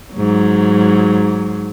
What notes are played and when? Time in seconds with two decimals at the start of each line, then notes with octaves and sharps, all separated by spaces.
0.14 G#2 F#3